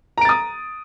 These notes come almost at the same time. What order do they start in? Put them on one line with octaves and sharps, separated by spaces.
A#5 D7 A6 D#6